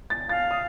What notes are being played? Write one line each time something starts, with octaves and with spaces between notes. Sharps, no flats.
A6
F5 A6
D#6